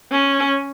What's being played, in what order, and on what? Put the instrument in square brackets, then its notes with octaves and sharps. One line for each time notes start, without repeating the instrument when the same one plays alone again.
[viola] C#4